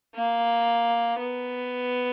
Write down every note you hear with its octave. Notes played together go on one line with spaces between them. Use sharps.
A#3
B3